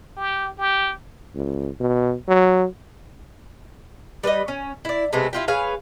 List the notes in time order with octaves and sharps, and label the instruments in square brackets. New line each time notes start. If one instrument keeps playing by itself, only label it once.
[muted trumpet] G4
G4
[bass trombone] C#2
B2
F#3
[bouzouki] G3 B4 C#5 D#5
C#4
E4 D5
C3 G#3 A3 B3
E4 F4 G4
G#4 B4 C#5 F5